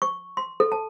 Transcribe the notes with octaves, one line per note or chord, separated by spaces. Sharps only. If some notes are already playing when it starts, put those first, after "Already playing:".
C#6
C6
A4
A5